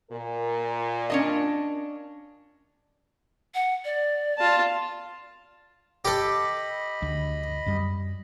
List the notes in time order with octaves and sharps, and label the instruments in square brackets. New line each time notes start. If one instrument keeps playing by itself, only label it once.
[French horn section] A#2 A#4
[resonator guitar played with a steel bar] C#4 D4 D#5
[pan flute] F#5
D5
[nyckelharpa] F4 A5
[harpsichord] G4 A4 [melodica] D#5 B5
[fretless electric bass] D2
F#2 G3